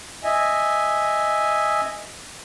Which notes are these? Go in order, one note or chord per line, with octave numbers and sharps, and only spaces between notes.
D#5 E5 G#5